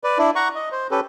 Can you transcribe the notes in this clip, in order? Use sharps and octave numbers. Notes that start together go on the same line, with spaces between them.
B4 D5
D4 E4
F#5 A#5 C#6
D#5
C5
C#4 G4 A4 B4